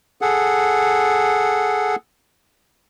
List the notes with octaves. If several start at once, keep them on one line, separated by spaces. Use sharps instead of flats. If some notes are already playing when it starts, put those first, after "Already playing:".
G#4 A4 F#5